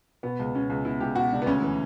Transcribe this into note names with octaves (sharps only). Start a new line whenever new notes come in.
B2 B3
C#2
B2 C#4
C#2
B2 E4
C#2 G4
B2 F#4
C#2 D4
B3
D2 C#4
E3